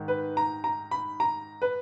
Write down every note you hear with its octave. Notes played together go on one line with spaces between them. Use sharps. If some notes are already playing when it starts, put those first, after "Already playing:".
Already playing: G#2 D#3
B4
A#5
A#5
B5
A#5
B4